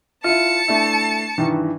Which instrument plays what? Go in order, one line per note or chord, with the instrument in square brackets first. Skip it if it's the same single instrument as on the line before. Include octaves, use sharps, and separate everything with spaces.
[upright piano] E4 F4 [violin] A5 C#7
[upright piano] A3 D4 E4
G2 D#3 E3